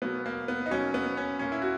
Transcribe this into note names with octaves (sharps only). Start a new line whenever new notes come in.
B2 F#3 A#3 B3
A#3
B3
D#4
B2 F#3 A#3 C#4
B3
C#4
A#2 A#3 C#4
E4
F#4